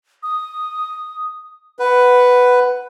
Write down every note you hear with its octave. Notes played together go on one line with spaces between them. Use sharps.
D#6
B4 F#5